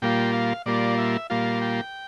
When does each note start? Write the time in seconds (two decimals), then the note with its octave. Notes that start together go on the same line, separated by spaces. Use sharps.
0.02 A#2 G3 A#3 F4 G5
0.33 F5
0.66 A#2 G3 A#3 F4 D5
0.98 E5
1.30 A#2 G3 A#3 F4 F5
1.62 G5